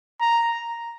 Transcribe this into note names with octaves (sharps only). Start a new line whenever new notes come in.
A#5